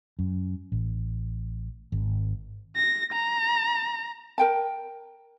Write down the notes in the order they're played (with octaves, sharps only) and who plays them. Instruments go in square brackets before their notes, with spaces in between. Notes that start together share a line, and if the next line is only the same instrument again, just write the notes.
[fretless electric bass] F#2
A1
G#1
[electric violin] A#6
A#5
[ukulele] A#4 G5 A5